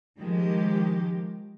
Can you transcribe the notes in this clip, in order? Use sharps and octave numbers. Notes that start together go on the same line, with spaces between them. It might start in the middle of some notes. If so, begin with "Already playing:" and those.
D#3 F3 G#3 G4